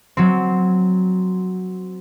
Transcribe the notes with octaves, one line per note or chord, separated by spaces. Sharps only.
F#3 C4